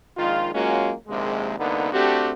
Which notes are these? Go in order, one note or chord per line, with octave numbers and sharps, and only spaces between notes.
A#1 D#3 G#3 F4
F#3 G#3 A#3 C#4 F4 F#4
A#1 D#2 C3 G#3
C2 D3 A#3 B3 D#4
A3 C4 D4 F#4 G4